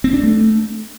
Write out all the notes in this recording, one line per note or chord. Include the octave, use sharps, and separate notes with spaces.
C4
D4
A3